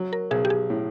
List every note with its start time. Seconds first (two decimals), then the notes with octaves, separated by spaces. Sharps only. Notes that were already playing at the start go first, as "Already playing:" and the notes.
Already playing: F#3
0.13 A#4
0.31 B1 G#4
0.45 G4
0.50 G#4
0.70 A2